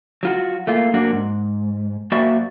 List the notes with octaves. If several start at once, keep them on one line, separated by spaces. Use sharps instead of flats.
F#3 F4 F#4
A3 A#3 F4
F#2 A#3 D4 F#4
G#2
F#2 A#3 F#4 C5 D5 E5